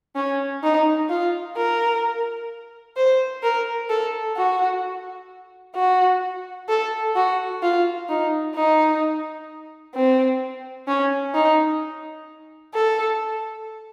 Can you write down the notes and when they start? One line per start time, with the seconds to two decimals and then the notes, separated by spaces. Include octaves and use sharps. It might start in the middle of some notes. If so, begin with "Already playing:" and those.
0.16 C#4
0.63 D#4
1.10 F4
1.56 A#4
2.97 C5
3.43 A#4
3.89 A4
4.36 F#4
5.76 F#4
6.69 A4
7.16 F#4
7.63 F4
8.09 D#4
8.55 D#4
9.95 C4
10.88 C#4
11.35 D#4
12.74 A4